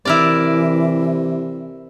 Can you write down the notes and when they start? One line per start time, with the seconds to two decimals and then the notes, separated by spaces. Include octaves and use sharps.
0.05 C3 E3 E4 A#4 D5